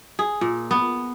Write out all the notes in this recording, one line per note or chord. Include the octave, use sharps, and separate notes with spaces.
G#4
A#2
B3